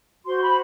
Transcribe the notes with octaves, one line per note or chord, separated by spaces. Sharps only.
F#4 C5 C6
B5